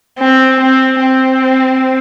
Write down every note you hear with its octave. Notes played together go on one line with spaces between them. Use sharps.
C4
C4
C4